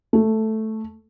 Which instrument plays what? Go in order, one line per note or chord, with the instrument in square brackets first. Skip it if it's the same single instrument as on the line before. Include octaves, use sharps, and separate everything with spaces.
[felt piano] A3